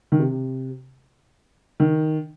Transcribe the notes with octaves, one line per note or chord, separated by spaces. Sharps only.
D#3
C3
D#3